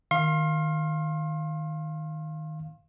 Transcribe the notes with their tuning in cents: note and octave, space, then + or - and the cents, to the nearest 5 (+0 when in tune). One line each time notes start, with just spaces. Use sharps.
D#3 -5 F5 -5 C6 +35